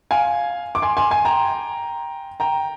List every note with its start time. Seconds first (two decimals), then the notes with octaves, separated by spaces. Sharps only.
0.11 F5 G#5
0.75 D6
0.82 G#5 C6
0.97 G#5 C6
1.11 G#5 C6
1.25 G5 A#5
2.40 G5 A#5